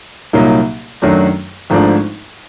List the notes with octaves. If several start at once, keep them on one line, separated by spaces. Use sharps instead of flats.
C2 A#2 F#3 A#3 D#4
F#2 D#3 F#3 A3 D4
G#1 G#2 F3 A3 D4